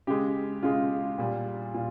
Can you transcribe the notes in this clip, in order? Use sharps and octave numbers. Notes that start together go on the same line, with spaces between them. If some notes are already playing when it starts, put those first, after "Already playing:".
C#3 G#3 G4
C#3 G#3 F4
A#2 G3
A#2 F4